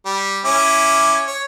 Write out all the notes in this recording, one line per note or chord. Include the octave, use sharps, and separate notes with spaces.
G3
C#4 E4 D6
C#5